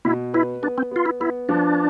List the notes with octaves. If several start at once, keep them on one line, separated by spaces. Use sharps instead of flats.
B2 E4
E4 B4
B3 D4
C4
B3 F4
E4
B3 E4
F3 D4